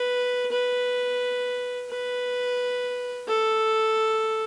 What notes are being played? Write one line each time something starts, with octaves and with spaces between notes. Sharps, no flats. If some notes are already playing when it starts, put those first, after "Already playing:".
Already playing: B4
B4
B4
A4